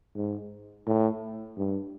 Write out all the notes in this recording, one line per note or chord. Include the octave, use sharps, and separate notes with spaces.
G#2
A2
G2